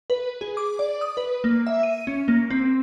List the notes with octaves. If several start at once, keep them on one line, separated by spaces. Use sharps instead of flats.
B4
G#4
D6
D5
D#6
B4
A#3
E5
D#7
C#4
A#3
C4